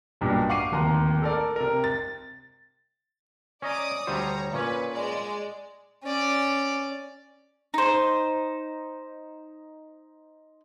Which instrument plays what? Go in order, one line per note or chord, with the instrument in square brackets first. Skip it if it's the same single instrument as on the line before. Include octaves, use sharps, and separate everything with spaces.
[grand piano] B1 G2 A#2
F5 F#5 C#6 D6 C7 D#7
D1 D#2 A#5 C6
A4 A#4 D5
C3 A#4
A6
[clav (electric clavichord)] C#4 D#5 A#5 [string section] D5 D6 D#6
[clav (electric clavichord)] D2 G3 C5 [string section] C#5 A#5
[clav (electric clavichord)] A#2 C#4 [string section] B4
[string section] G#3 D5
[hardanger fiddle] C#4 D5
[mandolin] D#4 C5